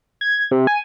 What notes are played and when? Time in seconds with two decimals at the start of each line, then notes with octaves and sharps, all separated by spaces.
0.21 G#6
0.51 C3
0.67 G#5